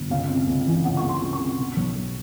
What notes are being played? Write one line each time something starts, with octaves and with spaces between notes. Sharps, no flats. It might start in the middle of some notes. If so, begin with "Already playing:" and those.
Already playing: G1
C#2 F5
C3
C#2
E3
C#2 F#5
C#6
C#2
C6
C#2
C#6
C3
B2
B1
B2